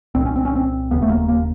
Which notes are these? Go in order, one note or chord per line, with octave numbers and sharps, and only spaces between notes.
C2 A#2 C4
C#4
C4
C#4
C4
E1 D#2 C#3 B3
A3
A#3
A#3